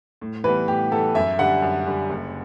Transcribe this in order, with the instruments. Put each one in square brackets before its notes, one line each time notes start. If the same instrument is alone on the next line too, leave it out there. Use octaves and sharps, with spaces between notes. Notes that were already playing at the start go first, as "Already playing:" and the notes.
[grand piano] A2
[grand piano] E3 G3 B3 [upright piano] B4
[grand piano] A2 [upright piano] G4
[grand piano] E3 G3 B3 [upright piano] A4
[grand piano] F#2 [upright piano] E5
[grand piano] D3 G3 [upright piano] F#5
[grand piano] F#2
D3 G3
F#1